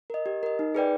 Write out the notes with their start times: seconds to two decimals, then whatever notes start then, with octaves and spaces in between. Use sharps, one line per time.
0.10 A#4 D#5
0.26 G4
0.43 A#4 D#5
0.59 D#4
0.75 G#4 B4 D5 G5